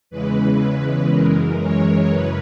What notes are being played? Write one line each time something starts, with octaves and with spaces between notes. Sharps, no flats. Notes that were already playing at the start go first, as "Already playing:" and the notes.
E2 C#3 E3 G#3 B4
F#2 E3 G#3 A#4
C#5
F#2 C#3 B4